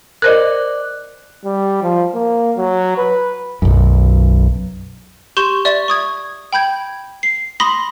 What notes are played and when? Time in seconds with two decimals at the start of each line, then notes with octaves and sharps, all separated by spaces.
0.22 A#4 C5 D5 D#5 F#6
1.45 G3
1.83 F3
2.14 A#3
2.57 F#3
2.98 B4
3.62 B1 F#2
5.37 G4 C6 C#6 G6 E7
5.65 D5 E5 C#6
5.88 C#6 D#6 G#6
6.53 G5 B5 G6 G#6
7.23 C7
7.60 B5 C6 D#6 A#6 B6